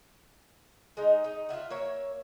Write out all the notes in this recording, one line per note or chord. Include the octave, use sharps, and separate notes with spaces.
G#3 D#4
D#4
F4 G#4 E5 F#5
A#3 C#5 E5